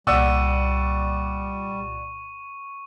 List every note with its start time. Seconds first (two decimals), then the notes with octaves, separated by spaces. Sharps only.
0.07 C2 A#2 G3 D5 F#5 C#6 E6 D#7